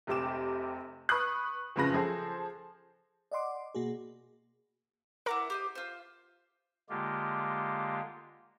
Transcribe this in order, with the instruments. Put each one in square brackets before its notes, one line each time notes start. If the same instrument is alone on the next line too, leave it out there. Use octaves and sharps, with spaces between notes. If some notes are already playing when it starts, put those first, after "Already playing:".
[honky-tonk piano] F1 C3 G4 D6 E7
B4 C#6 D#6 F#6
F#1 F2 C#3 F4 B4 A#6
F3 G#4 A4 C5
[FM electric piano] D5 D#5 F#5 C6 D6
B2 A#3 F#4 G#4
[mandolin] E4 F#5 D6 [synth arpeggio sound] A#4 A#5
[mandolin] G4 C5 D#5
F4 C5
[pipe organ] D3 G#3 A#3 F4 G4